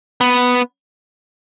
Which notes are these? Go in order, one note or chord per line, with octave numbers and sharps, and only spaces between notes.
B3